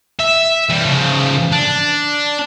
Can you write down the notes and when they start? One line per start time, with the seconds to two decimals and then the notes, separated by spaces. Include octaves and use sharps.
0.20 E5
0.69 E3 G3
0.85 C#3 F3
1.52 D4